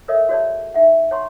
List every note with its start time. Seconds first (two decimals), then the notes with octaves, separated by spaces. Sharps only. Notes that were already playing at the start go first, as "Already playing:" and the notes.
0.08 A4 A#4 C#5 D#5 E5
0.29 F#4 G#4 C#5 D5 E5 A5
0.74 D#4 E5 F#5
1.11 C#5 F#5 G#5 A#5 C6 C#6